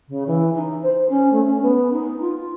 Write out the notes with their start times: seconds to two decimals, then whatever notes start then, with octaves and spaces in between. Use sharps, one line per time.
0.08 C#3
0.27 E3
0.55 D#4
0.82 C5
1.09 C#4
1.32 A3
1.45 C#4
1.62 B3
1.92 D#4
2.21 F4